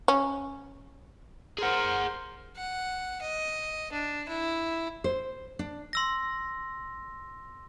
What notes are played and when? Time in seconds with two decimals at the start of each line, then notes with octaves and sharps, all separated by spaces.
0.08 C#4
1.58 G#4 A#4 C5 F#5
2.56 F#5
3.21 D#5
3.92 D4
4.29 E4
5.04 C5
5.59 D4
5.93 C6 E6 A#6